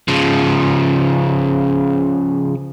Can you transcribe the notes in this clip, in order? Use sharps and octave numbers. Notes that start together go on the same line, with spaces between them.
C#3 F3